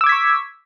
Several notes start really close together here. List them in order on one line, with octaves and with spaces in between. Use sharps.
E6 D6 G#6 B6 C#6